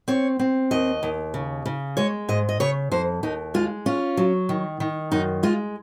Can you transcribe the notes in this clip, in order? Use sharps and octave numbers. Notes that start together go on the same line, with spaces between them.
C4 C#5
C4
D#2 D#5
D#2
C#3
C#3
G#3 C#5
G#2 D#5
D#5
C#3 C#5
F2 C5
D#2 D#4
G#3 F4
C#4 F4
F#3
D#3
D#3
F#2 D#4
G#3 F4